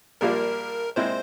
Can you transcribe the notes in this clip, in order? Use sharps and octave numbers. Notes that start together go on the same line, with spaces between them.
A#1 A#2 G3 A#3 F4 A#4
A#2 G#3 C4 E4 C5